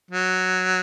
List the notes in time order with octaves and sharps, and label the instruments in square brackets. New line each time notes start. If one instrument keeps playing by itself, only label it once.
[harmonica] F#3